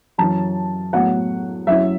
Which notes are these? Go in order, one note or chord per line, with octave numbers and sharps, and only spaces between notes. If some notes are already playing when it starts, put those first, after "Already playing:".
F#2 E3 C#4 A5
A2 F#3 B3 F#5
F#2 F#3 C#4 E4 E5